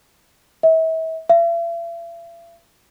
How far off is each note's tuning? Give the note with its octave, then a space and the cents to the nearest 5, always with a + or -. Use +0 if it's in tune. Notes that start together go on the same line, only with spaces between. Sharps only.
E5 -35
E5 +45